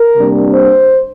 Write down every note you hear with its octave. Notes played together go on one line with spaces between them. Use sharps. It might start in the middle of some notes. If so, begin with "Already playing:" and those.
Already playing: A#4
C3 G3 A#3 D4
C5